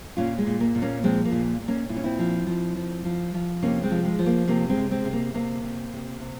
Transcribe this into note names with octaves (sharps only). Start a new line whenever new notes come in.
A#2 C#4 F4
G#3
A#2
A#3
A#2
A#3 C#4
F3 G#3 C4
A#3
A#2
A#2
A#3 C#4
A#2 E4
C#4
C4 E4
F3
F3
F3
F3
F3
C3 A#3 C#4
G#3 C4
F3
G#3
F3
A#3
C3 A#3
G#3 C4
C3
G#3 C4
C3
A#3
C3 A#3
C3
C3
C3